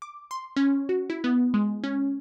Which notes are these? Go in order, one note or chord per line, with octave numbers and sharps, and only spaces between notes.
D6
C6
C#4
F#4
E4
B3
G#3
C#4